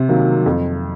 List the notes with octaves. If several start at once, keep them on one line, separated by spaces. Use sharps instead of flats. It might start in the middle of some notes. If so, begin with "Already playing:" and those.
Already playing: C3
D#3 F#3 A#3
F2